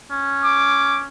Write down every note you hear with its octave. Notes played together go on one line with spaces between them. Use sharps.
C#4
D6